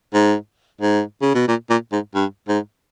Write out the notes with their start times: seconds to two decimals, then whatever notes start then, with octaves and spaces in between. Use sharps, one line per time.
0.14 G#2
0.81 G#2
1.22 C#3
1.35 B2
1.48 A#2
1.70 A#2
1.92 G#2
2.15 G2
2.48 G#2